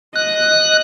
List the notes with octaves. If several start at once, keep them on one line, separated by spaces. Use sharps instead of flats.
D#5 F#6